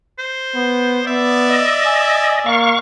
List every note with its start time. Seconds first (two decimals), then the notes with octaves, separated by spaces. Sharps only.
0.19 C5
0.55 B3
1.07 B3 D5 E5
1.49 D#5
1.86 G#5
2.46 A#3 F5 C#6